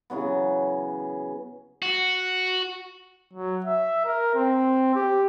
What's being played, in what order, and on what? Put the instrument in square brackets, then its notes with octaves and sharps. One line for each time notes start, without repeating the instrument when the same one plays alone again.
[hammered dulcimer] C#3 E3 F#3 B3
[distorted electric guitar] F#4
[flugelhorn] F#3
E5
A#4
C4
G4